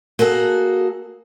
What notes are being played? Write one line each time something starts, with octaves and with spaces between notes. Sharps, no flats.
A#3 F#4 G#4 A4